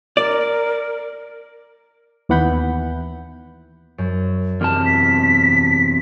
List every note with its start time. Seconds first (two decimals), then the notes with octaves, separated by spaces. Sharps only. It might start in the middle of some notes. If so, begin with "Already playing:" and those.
0.17 A#4 D5
2.29 D#2 E3 B3 F#5 B5 G6
3.98 F#2
4.61 E2 C3 A5 F6
4.86 B6